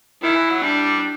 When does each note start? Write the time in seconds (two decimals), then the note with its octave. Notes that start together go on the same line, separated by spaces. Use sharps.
0.22 D#3 E4
0.36 E3
0.50 F#3
0.63 G3 D4